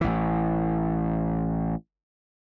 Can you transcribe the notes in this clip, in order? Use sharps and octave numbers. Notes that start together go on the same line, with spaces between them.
A1 E3